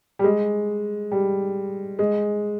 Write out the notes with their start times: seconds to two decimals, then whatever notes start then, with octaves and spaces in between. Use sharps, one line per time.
0.19 G3
0.24 G#3
1.12 G3
1.99 G#3